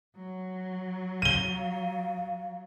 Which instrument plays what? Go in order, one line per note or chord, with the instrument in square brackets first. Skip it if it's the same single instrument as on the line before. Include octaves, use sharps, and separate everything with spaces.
[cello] F#3
[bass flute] F5 [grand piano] D#7 G7